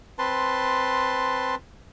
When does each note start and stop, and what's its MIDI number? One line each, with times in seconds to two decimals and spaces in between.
0.19 1.55 60
0.19 1.55 71
0.19 1.55 81
0.19 1.55 84